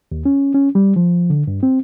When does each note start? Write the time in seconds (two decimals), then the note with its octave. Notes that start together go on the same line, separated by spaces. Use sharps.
0.12 D#2
0.25 C#4
0.54 C#4
0.75 G3
0.96 F3
1.30 D3
1.48 G2
1.63 C4